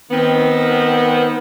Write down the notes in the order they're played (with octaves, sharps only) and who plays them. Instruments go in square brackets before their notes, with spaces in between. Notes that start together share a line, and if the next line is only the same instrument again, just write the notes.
[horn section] D#3 B3 C4